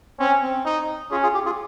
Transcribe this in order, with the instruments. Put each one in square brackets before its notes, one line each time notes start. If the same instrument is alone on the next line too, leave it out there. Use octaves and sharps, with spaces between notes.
[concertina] C4 [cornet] C#4
[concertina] C4
[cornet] D#4
[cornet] C#4 [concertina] F4 G#4
[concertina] F4 G#4
G4
F4 G#4